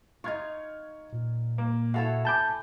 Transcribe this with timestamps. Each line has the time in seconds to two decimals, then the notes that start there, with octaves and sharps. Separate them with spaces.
0.24 D#4 F4 C#6 F6 G#6
1.12 A#2
1.58 A#3
1.94 E4 F#4 A4 C#5 F5 F#5
2.25 G#5 A5 B5 D6 G6